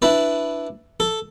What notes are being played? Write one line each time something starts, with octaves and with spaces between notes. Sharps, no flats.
D4 E4 B4 D5
A4